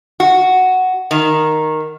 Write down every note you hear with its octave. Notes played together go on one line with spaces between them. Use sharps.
F#4
D#3